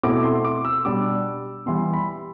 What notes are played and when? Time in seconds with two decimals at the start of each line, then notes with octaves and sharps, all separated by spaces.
0.03 B2 A3 C4 E4 D6
0.23 C6
0.45 D6
0.65 E6
0.85 B2 G3 D4 D6
1.66 E3 G3 B3 C6
1.94 B5